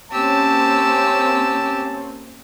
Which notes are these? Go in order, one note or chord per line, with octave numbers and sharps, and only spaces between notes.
A#3 C4 C#4 G4 A5 E6